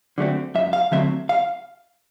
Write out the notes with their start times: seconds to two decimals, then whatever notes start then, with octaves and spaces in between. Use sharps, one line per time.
0.18 D3 F#3 A3 C4
0.55 F#2 E5
0.73 F5
0.92 D3 F#3 A3 C4 E5
1.29 F5